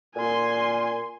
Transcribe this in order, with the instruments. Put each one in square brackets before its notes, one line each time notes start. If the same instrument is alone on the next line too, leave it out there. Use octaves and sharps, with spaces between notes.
[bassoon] A#2 [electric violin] G#5 C6